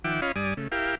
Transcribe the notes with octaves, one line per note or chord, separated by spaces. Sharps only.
D#3 F3 E5 F#5 G5 D6
C#4 F4 C#5 D#5 F5 B5
G2 G3 D5 G#5 D#6
C#3 A3
E4 G4 A#4 F5 G5